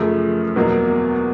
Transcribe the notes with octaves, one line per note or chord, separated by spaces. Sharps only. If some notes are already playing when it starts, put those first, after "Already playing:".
Already playing: F#2 C#3 F3 A3
E2 B2 F#3 A#3